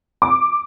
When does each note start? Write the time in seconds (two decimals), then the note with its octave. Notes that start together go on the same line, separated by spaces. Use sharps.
0.22 D6